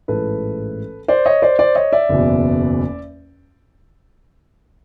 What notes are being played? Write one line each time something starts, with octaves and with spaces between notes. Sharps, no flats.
A1 G#2 E3 A4 B4
C5 D5
C#5 D#5
C5 D5
C5 D5
C#5 D#5
D5 E5
F#1 E2 B2